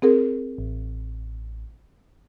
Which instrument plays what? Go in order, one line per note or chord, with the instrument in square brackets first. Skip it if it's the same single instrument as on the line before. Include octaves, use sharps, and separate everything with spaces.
[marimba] C4 G#4 A#4
[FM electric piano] A1